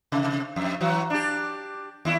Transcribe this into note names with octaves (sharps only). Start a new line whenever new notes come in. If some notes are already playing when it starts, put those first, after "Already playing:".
C3
F2
E3 F#3 F#4
D4 G4
D#2 E4